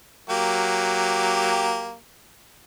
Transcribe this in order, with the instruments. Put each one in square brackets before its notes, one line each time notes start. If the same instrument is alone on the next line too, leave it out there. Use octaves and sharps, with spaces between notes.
[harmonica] F#3 A#3 G4